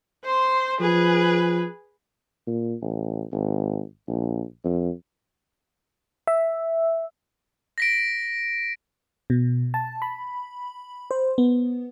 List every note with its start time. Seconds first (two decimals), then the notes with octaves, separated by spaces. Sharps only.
0.24 C5 C6
0.81 F3 G#4 B4
2.48 A#2
2.82 A1
3.32 G#1
4.08 A#1
4.64 F2
6.27 E5
7.78 A#6 B6 D7
9.30 B2
9.74 A5
10.02 B5
11.11 C5
11.38 B3